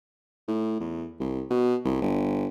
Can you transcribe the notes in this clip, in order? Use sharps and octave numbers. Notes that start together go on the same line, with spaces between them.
A2
E2
C2
B2
C2
G1